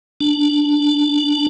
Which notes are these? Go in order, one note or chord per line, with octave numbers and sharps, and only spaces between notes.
D4